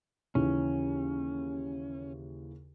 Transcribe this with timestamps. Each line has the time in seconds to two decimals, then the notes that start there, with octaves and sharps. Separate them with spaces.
0.35 D#2 C#3 E3 C#4